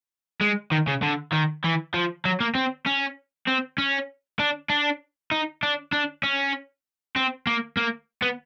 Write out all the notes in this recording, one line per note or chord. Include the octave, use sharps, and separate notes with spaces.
G#3
D#3
C#3
D3
D#3
E3
F3
F#3
A#3
C4
C#4
C4
C#4
D4
D4
D#4
D4
D4
C#4
C4
A#3
A#3
B3